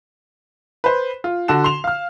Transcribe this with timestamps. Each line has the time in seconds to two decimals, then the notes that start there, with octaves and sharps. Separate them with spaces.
0.84 B4 C5
1.24 F4
1.48 D3 F#4 A4 E7
1.64 C6 F7
1.84 F5 F6